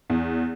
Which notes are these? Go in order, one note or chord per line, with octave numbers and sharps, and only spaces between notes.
E2